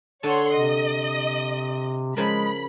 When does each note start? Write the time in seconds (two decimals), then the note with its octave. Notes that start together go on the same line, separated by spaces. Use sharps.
0.23 D3 A4 C#5 F#5 C6
0.52 C3 D#5
2.17 C#3 F3 G#3 A#4 B5